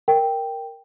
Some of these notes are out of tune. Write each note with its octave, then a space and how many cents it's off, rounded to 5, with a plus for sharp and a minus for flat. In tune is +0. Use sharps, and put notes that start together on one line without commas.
A#4 +0 G5 +0